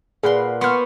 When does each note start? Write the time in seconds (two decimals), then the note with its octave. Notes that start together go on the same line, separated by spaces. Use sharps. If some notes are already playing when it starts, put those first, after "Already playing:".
0.23 A#2 G#4 B4 F#5 C6
0.61 B3 C5 C6 C#6 F6